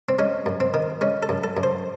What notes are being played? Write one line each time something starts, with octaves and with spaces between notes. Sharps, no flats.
C4
G#3 C#4
F#2
C4
D#3
G#3 C#4
A4
F#2
A4
F#2
C5